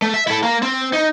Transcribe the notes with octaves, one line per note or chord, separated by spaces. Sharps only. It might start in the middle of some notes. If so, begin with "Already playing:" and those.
A3
E5
E4 A4
A#3
C4
D#4